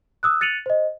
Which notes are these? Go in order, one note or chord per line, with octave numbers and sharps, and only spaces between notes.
D#6 E6 F#6
F#6 A6 C#7 D#7 F7 F#7
C5 D#5